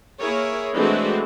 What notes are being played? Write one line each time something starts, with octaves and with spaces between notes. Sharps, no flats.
A#3 E4 G#4 A#4 C#5
E3 G#3 A3 C4 D4 F#4